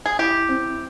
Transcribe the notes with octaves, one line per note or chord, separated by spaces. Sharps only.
G#4
E4 G4
C4